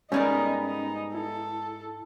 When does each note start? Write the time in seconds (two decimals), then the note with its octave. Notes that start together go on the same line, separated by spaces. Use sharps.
0.12 G#2 G3 B3 C#4 D#4 G#4 A#4 D5
0.64 D#4
1.15 E4 A4